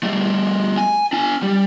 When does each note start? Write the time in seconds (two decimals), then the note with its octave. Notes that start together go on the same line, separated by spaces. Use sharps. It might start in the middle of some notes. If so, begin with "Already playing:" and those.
0.03 G3 A3
0.77 G#5
1.13 D4 G#5
1.42 G3